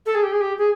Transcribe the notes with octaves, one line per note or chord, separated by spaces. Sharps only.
A4
G#4
G4
G#4
G4
G#4